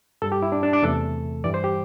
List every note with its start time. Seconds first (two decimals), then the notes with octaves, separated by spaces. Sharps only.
0.22 G2 G3 A4
0.32 G4
0.43 E4
0.52 D4
0.63 D4
0.73 D4
0.83 E2 C3 E3 A3 A4
1.44 G2 E3 G3 D5
1.54 C5
1.64 G4